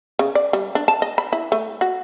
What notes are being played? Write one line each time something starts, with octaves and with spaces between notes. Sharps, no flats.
C#3
D5
G3
D4
A5
D#5
B5
E4
A3
F#4